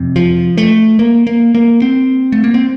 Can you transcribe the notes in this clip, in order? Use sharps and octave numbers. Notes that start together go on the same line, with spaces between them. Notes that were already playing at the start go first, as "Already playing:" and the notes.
Already playing: F2 C3
F3
A3
A#3
A#3
A#3
C4
A3
A#3
C4